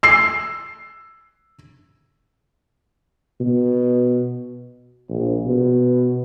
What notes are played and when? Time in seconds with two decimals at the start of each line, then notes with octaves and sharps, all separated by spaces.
0.03 E6 C7
3.40 B2
5.09 A#1
5.45 B2